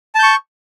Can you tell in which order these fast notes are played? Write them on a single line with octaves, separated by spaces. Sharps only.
A5 G6 C#6